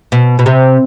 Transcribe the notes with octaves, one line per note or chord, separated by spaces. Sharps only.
B2
B2
C3